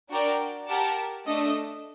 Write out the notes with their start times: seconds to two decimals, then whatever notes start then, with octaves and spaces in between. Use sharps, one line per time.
0.09 D4 F#4 A#4 D5 G5
0.67 G4 A#4 F#5 A5
1.27 A3 D4 A4 D#5